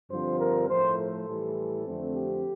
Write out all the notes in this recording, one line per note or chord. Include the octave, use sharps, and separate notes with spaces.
G2 D3 F3 C4 C5
A#4
A2 F3 A3 C5
A4
A2 E3 G3
F2 D3 A3 C4
G4